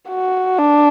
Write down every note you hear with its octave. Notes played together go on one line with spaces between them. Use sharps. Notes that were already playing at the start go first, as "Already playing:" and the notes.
F#4
D4